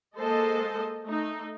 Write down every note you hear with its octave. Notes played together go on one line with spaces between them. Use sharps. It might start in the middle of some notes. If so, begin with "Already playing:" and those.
G#3 A#3 A4 C5 D#5 A5
A3 D#4